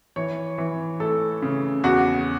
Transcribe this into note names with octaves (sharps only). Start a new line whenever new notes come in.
E3 C#5
E3
A3 A4
C#3
E2 F#4